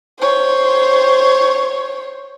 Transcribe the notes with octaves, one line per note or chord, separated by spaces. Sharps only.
C5 C#5